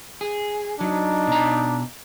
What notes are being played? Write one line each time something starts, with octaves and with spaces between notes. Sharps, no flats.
G#4
F#3 D4 D#4
B2 A#5